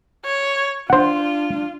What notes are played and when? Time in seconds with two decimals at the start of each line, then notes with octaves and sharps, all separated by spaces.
0.25 C#5
0.90 D4 F4 C5 F#5